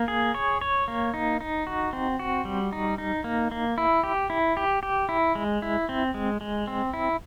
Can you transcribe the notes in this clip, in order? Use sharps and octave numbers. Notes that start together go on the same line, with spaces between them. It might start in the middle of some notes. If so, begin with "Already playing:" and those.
Already playing: A#3
G#4
C#5
C#5
A#3
D#4
D#4
F#4
C4
F#4
G3
D#4
D#4
A#3
A#3
E4
G4
E4
G4
G4
E4
G#3
E4
C4
G#3
G#3
C4
E4